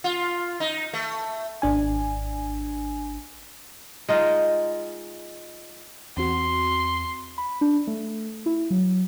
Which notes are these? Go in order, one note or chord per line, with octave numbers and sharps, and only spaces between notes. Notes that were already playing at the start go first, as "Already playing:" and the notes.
F4
D#4
A3
G#1 D4 G#5
G#3 D#4 F4
E2 C4 F#4 C6
B5
D4
A3
E4
F#3